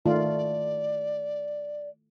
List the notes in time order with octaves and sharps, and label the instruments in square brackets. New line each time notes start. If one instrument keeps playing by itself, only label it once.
[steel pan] D#3 A3 F4 [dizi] D5